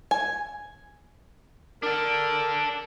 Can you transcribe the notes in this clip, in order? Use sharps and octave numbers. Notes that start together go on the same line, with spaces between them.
G#5
D4 A4 A#4